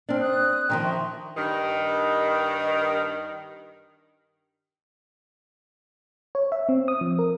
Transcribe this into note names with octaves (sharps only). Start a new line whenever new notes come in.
C4 D4 F6
D#6 F#6
D3 D#3 F3 A#4 G5 A#5
E5 C6 C#6
G2 D#3
C#5
E5
C4
D#6
F3
A#4